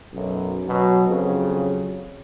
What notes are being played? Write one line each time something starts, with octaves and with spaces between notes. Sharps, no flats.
B1 F#2
B2 F#3
F2 C#3 F#3